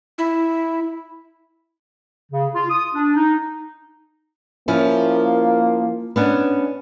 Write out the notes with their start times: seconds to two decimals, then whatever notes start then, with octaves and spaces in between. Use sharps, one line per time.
0.18 E4
2.32 C#3
2.54 F4
2.70 D#6
2.95 D4
3.16 D#4
4.68 F3 A#3 C#4 E4
6.16 B3 C#4 D4